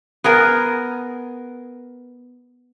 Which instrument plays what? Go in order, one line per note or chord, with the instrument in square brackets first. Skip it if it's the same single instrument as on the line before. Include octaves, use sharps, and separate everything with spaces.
[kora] B3 G#4 A#4